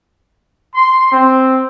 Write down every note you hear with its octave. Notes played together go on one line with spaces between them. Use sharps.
C6
C4